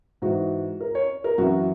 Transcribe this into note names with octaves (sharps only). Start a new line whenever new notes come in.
G#2 E3 F#4
A#4
C#5
A#4
F#2 E3 F#4